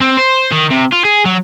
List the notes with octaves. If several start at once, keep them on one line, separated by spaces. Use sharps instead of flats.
C4
C5
D#3
C3
F4
G#4
F#3